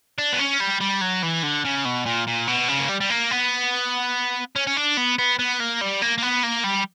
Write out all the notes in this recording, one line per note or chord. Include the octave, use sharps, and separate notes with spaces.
D4
B3
C#4
G3
G3
F#3
E3
D3
C#3
B2
A#2
A#2
B2
C#3
A#3
G3
G3
A#3
B3
C#4
C#4
D4
B3
B3
B3
A#3
G3
A#3
A#3
B3
A#3
G3